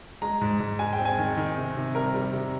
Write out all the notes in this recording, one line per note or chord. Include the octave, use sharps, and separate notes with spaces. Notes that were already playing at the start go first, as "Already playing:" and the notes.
G#3 A#5
G#2
G#2
G#3 G#5
G5
C4
G#5
D#3
D#3
C3
C3
G3 A#4
G3
C3